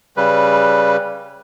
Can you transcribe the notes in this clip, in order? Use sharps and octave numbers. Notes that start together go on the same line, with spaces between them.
C#3 G3 B4